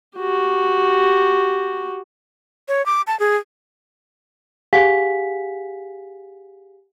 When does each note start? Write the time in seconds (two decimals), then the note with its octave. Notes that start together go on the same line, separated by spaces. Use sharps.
0.18 F#4 G4
2.68 C#5
2.86 D6
3.07 A5
3.20 G#4
4.73 G4 G#4 F5 F#5 G#5 B6